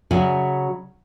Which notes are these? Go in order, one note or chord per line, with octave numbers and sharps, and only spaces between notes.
C#3 F#3 E5 G#5